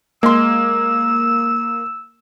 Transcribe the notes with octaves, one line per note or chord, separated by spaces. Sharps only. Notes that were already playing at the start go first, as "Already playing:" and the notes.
G#3 A#3 C6 E6